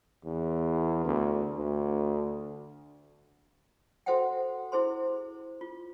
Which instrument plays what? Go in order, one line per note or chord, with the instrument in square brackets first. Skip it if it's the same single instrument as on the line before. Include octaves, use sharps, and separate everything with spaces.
[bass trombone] E2
D2
D2
[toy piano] F#4 A4 C5 E5 F#5 G5
E4 G#4 C5 C6
F4